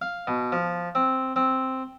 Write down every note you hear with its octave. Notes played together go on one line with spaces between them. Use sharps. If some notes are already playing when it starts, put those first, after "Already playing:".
F5
B2
F3
C4
C4